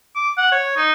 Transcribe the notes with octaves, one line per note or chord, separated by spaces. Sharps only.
D6
F#5
C#5
D#4